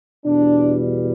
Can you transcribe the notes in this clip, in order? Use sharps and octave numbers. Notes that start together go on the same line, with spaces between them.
E2 B2 G3 D4